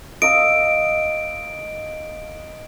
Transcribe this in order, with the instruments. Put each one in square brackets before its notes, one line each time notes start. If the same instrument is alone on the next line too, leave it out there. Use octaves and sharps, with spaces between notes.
[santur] D#5 F5 E6 [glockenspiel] D7